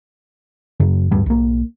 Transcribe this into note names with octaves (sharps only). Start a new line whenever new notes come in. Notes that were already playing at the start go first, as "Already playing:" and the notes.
F#2 C#3 F#3
D1 G2 G3 B3
B1 A#3